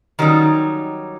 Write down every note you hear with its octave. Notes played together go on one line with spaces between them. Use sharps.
D#3 F#3 G3 C#4 D#4